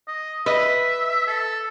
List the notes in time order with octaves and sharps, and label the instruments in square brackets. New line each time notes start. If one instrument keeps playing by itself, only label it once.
[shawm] D#5
[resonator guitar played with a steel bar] B4 D#5 [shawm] E5
[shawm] A4